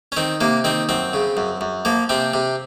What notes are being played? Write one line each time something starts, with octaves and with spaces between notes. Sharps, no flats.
C#4
D#3 C4
C3 A#3
D#3 C4
F#2 C4
C#3
F#2
F#2
F3 A#3
C3 C4
C3